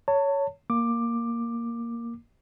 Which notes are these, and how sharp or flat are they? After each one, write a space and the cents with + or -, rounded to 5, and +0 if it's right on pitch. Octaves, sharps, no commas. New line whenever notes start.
C#5 +10 A5 +35
A#3 +0 D6 +10